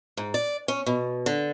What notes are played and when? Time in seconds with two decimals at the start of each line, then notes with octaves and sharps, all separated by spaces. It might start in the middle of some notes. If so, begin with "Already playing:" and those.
0.17 G#2
0.34 D5
0.68 C#4
0.86 B2
1.26 D3